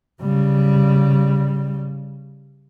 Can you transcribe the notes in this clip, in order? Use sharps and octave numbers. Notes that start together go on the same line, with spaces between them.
C#3 G3